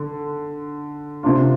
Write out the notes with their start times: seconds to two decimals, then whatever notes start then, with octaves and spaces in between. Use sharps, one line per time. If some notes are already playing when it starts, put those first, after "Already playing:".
Already playing: D3
1.23 C3 A#3 D4 F4